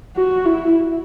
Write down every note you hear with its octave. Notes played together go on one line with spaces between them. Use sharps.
F#4
E4